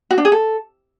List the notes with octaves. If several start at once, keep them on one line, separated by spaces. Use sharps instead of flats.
F#4
D4
G#4
A4